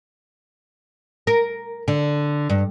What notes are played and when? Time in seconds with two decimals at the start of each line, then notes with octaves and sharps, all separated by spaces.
1.27 A#4
1.88 D3
2.49 G2